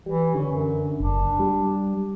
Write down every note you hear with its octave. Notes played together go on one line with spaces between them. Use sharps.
E3 G3
D3 C#4
F#2
F#1 D4
G3